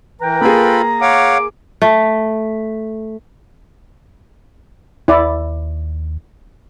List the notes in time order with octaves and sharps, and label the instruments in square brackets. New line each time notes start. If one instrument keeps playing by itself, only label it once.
[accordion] E3 [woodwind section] A#4 B4 G5 [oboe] A#5
[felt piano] A#3 G#4 [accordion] F4 A4 B5
[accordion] C#5 F5 F#5 [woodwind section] D6
[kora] A3
[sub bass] D#2 [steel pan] E4 D5